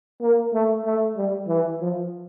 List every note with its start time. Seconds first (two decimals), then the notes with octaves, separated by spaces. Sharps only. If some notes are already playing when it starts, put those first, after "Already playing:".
0.21 A#3
0.54 A3
0.86 A3
1.17 G3
1.48 E3
1.81 F3